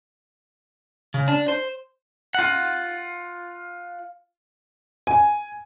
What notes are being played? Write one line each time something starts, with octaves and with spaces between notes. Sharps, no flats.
C#3
D4
C5
F4 F#5
G#5